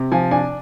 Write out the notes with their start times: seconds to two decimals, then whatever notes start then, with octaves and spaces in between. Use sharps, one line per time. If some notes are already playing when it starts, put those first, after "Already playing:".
Already playing: C3
0.12 F3 G#5
0.31 D4 G#5